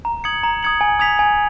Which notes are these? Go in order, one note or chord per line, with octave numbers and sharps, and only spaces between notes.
A#5
D#6 G#6 C#7 F#7
A#5
D#6 G#6 C#7 F#7
G#5
D#6 G#6 B6 F7
G#5